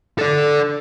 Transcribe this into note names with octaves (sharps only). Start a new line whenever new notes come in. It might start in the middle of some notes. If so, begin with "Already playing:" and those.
A4 D5